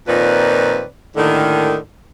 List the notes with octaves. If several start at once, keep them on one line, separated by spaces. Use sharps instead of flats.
F2 A#2 D#3 C4 B4 D5
D#2 A2 D3 D#3